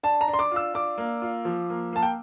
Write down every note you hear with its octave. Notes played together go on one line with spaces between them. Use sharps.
D4 A5
A#5
D4
C6
D6
F4 E6
D4 D6
A#3
F4
F3
A#3
A#3 A5
G5